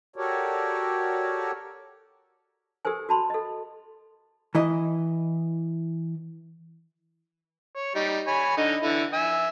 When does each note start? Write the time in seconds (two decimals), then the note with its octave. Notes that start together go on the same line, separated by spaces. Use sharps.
0.16 F#4 G4 A4 A#4 C#5 D5
2.85 G4 A4 A#4 C5 G#5
3.09 F#4 A5 B5 C6
3.30 A4 D#5
4.55 E3 E4 D#5
7.75 C#5
7.95 G3 D#4
8.27 C#5 G#5 B5
8.57 D3 D#4 D#5
8.83 D3 E3 E4
9.13 E5 G#5